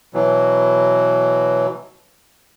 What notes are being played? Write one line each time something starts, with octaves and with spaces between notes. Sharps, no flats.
B2 E3 F#3